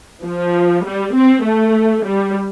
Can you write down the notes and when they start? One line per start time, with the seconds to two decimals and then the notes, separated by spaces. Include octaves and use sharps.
0.23 F3
0.84 G3
1.14 C4
1.45 A3
2.05 G3